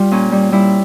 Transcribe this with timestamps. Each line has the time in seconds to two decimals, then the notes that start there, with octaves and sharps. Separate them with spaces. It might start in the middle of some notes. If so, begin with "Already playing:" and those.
Already playing: G3 F4
0.11 A#2 C#4
0.32 G3
0.52 G3 E4